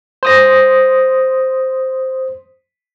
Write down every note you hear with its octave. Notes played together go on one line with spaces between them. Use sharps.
C5 D#6 A#6